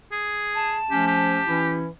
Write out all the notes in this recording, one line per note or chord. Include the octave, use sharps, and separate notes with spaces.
G#4
A5
F3 A3 C#4 G4
G4
E3 C#4 E4